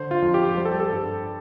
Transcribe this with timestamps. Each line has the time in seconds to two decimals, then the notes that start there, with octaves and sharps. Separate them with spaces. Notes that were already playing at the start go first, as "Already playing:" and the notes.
Already playing: D3 C5
0.11 F4
0.22 F2
0.34 G4
0.57 G3 C5
0.65 A4
0.72 G4
0.80 A4
0.93 G2